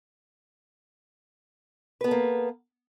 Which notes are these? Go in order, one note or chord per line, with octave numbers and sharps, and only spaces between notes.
A#3 B3 A4 B4